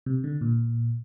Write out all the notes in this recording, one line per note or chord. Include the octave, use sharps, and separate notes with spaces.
C3
D3
A#2